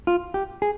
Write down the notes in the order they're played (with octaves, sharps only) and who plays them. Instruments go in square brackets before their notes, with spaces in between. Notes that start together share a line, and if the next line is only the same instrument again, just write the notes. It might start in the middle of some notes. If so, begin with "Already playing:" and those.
[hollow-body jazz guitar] F4
G4
G#4